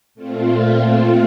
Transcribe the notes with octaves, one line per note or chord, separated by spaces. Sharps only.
A#2 A3 C4 F4